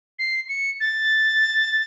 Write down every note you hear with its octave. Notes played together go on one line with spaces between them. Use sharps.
C7
C#7
A6